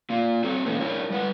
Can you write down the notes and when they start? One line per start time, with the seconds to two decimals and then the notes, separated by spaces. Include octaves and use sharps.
0.10 A#3 F4
0.44 C4 F#4 A4
0.66 E3 A#3 B3 C#4 D#4
0.80 D4 E4 A#4 C#5
1.10 G3 B4 F#5